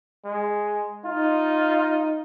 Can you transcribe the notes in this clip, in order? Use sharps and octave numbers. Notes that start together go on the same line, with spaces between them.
G#3
D#4 F4